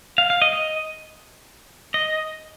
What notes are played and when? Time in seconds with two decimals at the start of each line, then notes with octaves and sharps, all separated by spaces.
0.18 F5
0.30 F5
0.42 D#5
0.53 D#5
1.94 D#5